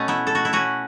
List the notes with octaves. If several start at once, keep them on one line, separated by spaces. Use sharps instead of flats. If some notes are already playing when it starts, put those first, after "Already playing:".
Already playing: B2 A3 C#4 B4
B3 E4
A4
F#4
E4
C#4 F#4